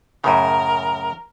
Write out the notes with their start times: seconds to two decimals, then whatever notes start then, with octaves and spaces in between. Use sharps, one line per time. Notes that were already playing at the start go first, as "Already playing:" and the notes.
0.24 F#2 A2 C#3 A#4